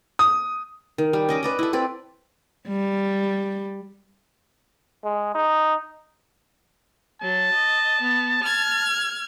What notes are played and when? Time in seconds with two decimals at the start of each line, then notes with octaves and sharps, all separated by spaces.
0.19 D#6
0.98 D#3
1.13 G3
1.29 C#4 D#5 D6
1.43 B4 D5 D#5
1.59 E4 A4
1.73 C4 B4 D5
2.68 G3
5.04 G#3
5.34 D#4
7.22 F#3 A5
7.53 D#5
8.00 B3
8.42 F6 G#6